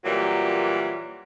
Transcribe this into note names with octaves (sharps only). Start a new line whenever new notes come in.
A#2 E3 F#3 G3 A#3